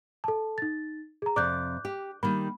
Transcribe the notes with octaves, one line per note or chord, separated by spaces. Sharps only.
A4 A5
D#4 A6
G#4 A#5
F2 C3 D5 D6 F#6 G6
G4
D#3 G3 A#3 B5